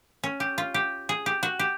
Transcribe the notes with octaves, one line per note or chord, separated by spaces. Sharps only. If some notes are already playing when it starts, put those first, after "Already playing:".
C#4
G4
F4
G4
G#4
G4
F#4
G4